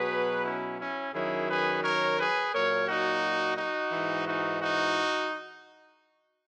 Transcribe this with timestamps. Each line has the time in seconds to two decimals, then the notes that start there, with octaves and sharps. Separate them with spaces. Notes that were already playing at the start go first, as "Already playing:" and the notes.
Already playing: B2 F#3 G#4 B4
0.44 C#4 E4
0.79 C#4 E4
1.13 F#2 D#3 F#3 E4 G#4
1.49 G#4 B4
1.83 A#4 C#5
2.18 G#4 B4
2.54 A#2 F#3 A#4 C#5
2.88 D#4 F#4
3.57 D#4 F#4
3.92 G#2 E3
4.26 D#4 F#4
4.61 D#4 F#4